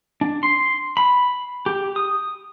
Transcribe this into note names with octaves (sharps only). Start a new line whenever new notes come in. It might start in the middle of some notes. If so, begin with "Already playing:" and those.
D4
C6
B5
G4
D#6